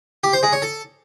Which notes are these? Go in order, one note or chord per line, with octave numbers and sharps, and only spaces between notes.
G4
C5
G#3
C#5
A4